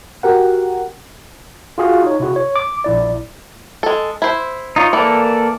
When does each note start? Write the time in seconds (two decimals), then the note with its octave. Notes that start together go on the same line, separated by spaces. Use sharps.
0.23 F#4 G4 A#4 F#5
1.78 F4 F#4 G#4 F5
2.03 D#4 C#5
2.20 C3 E4 F#4 G#4
2.36 C#5
2.56 D6
2.84 A#1 E4 D5
3.83 G#3 A4
4.22 E4 C5
4.76 D#4 F4 C#5
4.93 E3 A#3 A4 D5